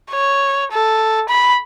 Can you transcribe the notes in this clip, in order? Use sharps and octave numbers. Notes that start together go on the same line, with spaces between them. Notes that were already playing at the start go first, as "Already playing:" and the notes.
C#5
A4
B5